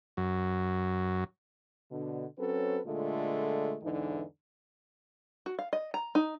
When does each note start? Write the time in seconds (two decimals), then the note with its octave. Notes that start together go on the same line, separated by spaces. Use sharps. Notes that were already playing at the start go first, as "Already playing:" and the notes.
0.17 F#2
1.92 B2 D3
2.39 F#3 C4 C#4 A4 B4
2.86 A#2 D3 G#3 A3 F4
3.82 E2 G#2 D3 E3 D#4
5.46 F#4
5.59 F5
5.73 D#5
5.94 A#5
6.15 D#4